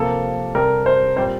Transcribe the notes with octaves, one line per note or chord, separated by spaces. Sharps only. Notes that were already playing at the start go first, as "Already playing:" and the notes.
Already playing: C3 F3 A#3 A4
C3 G3 C4 A#4
C5
A#2 G3 C4 C5